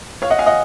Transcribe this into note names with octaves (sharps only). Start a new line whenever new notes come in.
C#5 F5
D#5 F#5
F5 G#5
D#5 F#5